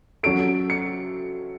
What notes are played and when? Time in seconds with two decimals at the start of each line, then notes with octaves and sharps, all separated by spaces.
0.23 F#3 C#4 F#4 A4 D7
0.70 C#7